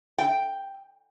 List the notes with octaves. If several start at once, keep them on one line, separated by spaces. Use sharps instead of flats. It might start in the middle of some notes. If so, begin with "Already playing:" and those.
G5